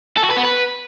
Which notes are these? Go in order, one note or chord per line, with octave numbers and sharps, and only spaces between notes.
A4
F#4
B4
B3
B4